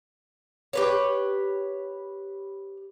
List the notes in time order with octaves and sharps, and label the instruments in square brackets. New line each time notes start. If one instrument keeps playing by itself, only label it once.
[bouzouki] G4 B4 C#5